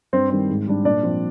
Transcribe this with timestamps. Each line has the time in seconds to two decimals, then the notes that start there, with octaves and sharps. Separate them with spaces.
0.13 G2 C4 C5
0.30 D#3 G3 C4
0.49 G#2
0.67 G3 D4
0.85 A#2 D4 D5
1.03 F3 C4